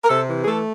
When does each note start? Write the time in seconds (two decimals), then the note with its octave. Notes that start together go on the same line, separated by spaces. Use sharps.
0.04 A#4
0.09 C3 A4
0.29 E3
0.43 G#4
0.47 A3 A4